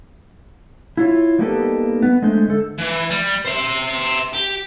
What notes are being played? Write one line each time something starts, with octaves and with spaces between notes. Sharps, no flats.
E4 F4 C#5
G3 A#3 B3 D#4 G4 A4
B3
G#3 A3 D4 C5
D3 A4
E3
G3
C5 E5
G4